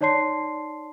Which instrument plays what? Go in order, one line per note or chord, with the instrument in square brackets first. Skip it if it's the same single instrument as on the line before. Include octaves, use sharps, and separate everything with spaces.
[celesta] D#4 C#5 D5 A5 C6 C7